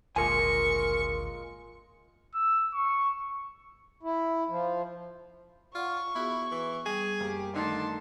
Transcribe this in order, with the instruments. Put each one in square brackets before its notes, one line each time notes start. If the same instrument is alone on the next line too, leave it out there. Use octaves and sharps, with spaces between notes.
[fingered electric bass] G#1 D2 [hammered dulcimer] A#2 G#3 [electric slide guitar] A#4 G#5 [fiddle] C#6
[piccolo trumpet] E6
C#6
[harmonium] E4
F3
[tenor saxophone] F4 [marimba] D5 F#5 [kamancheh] C#6
[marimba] B3 F#4 G#4 [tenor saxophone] E4
[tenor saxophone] E3
[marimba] G3 [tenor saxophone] G#4
[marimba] F#2 [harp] A#3 [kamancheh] G4
[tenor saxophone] D3 [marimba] D#3 A3 A4 [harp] D#4 [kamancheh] A5 C6